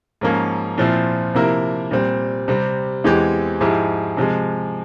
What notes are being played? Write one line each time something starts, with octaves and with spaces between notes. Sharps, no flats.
G#2 F3 A#3 C#4
A#2 F3 C4 E4
C3 F3 A#3 E4 A#4
A#2 G3 C4
C3 G3 C4
E2 E3 G#3 C4 G4
G#2 F3 G#3 E4 G4
C3 F3 G#3